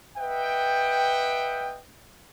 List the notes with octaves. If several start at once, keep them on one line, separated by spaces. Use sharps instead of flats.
B4 D#5 E5 F#5 G5